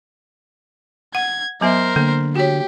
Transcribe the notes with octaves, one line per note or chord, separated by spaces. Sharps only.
F#5 G#6
F#3 B3 A#4 C5 E5
D3 A#3
F#4 G4 C#5